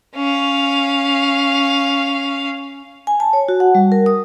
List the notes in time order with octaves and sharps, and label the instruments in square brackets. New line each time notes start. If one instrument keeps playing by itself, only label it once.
[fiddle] C#4 F5
[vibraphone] G#5
A5
C#5
F#4
F#5
G3
A#4
D#6